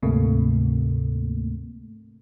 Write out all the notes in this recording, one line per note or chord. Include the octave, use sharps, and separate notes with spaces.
D2 G#2 C3 A3 A#3